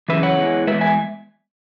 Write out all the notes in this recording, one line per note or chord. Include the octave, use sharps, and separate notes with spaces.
F#2 C#3 E3 B4 E5
C#5 F#5
E2 E3 G#3
E2 E3 G#3 B4 E5
E5 G#5